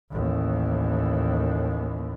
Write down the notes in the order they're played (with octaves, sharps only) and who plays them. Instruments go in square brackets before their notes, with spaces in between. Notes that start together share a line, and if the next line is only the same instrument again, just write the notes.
[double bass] A1 D#2